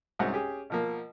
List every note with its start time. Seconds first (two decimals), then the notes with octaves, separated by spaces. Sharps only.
0.19 C2 G#2 C#4 F#4 C5 F#5
0.32 C#4 G4 G#4
0.70 B2 F3 A#3